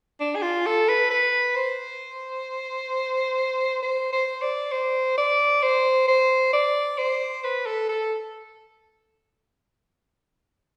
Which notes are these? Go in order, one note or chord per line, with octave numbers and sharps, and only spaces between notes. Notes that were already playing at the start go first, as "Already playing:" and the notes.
D4
G#4
F4
A4
B4
B4
C5
C5
C5
D5
C5
D5
C5
C5
D5
C5
B4
A4
A4